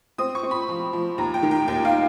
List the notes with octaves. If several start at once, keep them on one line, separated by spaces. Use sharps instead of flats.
C4 D#6
C#6
C4
B5
F3
F3
D#2 A#5
G5
D#3
G5
D#2 G5
F5